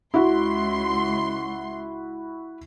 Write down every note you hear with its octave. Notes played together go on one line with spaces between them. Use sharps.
C#2 E4 F#4 C6